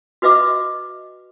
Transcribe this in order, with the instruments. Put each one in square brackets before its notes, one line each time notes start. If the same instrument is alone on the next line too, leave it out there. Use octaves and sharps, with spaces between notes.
[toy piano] F#4 B4 D#5 E5 D6